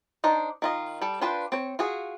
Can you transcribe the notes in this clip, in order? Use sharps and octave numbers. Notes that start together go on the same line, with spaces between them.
D4 D#4 C5
D#3 F4 D#5
G3 A4
D4 F4 B4 C5 G5
C4 C#5
F4 F#4 G#4